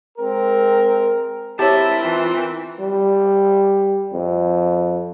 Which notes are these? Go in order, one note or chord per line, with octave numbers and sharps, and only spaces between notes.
G#3 C4 A#4
C4 E4 G4 A#4 C#5 G5 A5
E3 F4
G3
F2